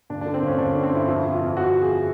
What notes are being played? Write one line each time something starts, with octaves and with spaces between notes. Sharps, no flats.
G1 D4
D4
D3
C4
G1 C#4
G1 D4
D3
C4
G1 E4
F2 E4
F2
F4
F2
F2 F#4
F2
G#4
F3